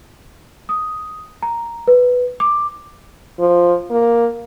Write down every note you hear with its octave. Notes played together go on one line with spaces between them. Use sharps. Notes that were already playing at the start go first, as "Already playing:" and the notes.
D#6
A#5
B4
D6
F3
A#3